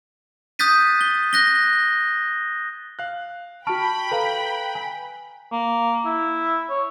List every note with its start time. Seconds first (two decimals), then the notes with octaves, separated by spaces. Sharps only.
0.59 D#6 F#6 G6 A6 B6 D#7
1.01 G7
1.33 F#6 A#6 G7
2.99 F5 F#6
3.67 F#4 G5 A5 B5 C#6 F6 D7
4.11 A4 B4 F5 A#5
4.75 G#5
5.52 A#3
6.05 E4
6.70 C#5